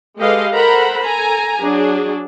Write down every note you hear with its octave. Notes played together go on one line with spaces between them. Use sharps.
G#3 G4 A4 B4 D#5 F5
A4 A#4 C5 F#5 A#5 B5
A4 G#5 A#5
F#3 D4 G#4